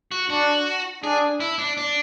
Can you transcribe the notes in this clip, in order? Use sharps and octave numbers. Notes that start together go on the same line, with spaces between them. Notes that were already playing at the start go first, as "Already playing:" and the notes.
F#4
D4 F#4
D4 G#4
E4
D4
D4